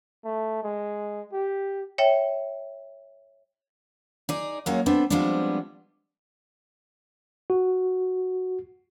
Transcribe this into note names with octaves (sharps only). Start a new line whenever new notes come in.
A3
G#3
G4
C#5 E5 G5
D#4 G#4 D5
F#3 G#3 A#3 C#4 D#4
B3 C4 D4 A4
F3 G3 G#3 B3 C4 D4
F#4